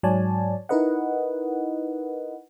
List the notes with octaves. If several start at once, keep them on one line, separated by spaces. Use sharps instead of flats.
G#2 F#3 C#5 D5 G#5 A5
D#4 E4 A#4 B4 D#5 F#5